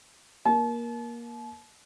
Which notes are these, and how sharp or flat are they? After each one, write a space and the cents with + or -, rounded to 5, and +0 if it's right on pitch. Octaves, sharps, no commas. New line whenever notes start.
A#3 +20 A5 -40